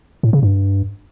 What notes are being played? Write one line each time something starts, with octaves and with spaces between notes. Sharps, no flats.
A2
C#3
G2